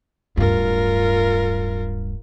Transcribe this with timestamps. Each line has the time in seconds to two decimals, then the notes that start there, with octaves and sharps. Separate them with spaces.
0.37 D1 G2 F4 A#4